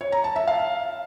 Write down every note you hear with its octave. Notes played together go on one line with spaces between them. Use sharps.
C#5
A#5
A5
E5
F5